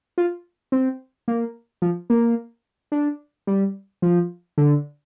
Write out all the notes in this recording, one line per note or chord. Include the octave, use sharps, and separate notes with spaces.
F4
C4
A#3
F3
A#3
D4
G3
F3
D3